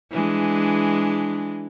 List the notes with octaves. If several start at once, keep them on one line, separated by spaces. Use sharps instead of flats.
E3 G#3 D4